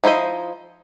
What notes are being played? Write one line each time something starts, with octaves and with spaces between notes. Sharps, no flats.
F3 D#4 E4 C5 D#5